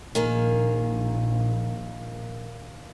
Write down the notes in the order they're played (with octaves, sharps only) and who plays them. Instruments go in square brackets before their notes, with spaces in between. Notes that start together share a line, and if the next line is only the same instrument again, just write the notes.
[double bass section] A#1 [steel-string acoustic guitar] D#3 A#3 G#4